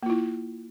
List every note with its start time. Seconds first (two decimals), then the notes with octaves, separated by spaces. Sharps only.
0.03 A#3
0.06 F4
0.10 E4